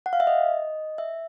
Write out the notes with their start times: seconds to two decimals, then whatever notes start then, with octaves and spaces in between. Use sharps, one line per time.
0.06 F#5
0.13 F5
0.20 E5
0.27 D#5
0.98 E5